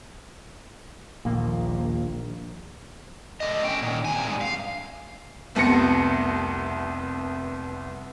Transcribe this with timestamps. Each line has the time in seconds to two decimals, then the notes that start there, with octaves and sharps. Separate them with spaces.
1.25 A#1 D#2 A#3
3.40 D3 D#5
3.64 C#4 G5
3.82 A#2 D#3
4.05 C3 G#5
4.26 G2 G#3
4.41 F5
5.55 F1 C2 B3 A#6 C#7